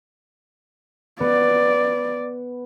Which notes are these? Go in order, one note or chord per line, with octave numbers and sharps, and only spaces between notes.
B3 D5